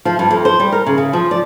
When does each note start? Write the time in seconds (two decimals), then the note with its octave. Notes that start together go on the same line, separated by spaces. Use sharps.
0.05 F3
0.19 G2
0.31 F2
0.45 C5
0.60 G3
0.72 A#4
0.87 C#3
0.98 C#3
1.13 F3
1.31 D5